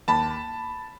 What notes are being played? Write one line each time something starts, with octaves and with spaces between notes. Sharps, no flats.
D#2 A5 B5